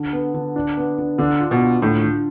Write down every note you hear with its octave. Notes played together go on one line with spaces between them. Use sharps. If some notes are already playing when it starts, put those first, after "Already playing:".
Already playing: D3
B3
D3
D4
B3
D4
D3 D4
F4
B2
F4
A2 D3
D3